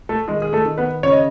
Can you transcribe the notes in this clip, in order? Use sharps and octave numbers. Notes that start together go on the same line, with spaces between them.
A3 A4
D#3 G#3 G#4
G#4
A3 A4
D#3
B3 B4
C#3 C#5
D#5